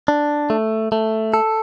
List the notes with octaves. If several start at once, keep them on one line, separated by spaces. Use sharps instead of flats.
D4
A3
A3
A4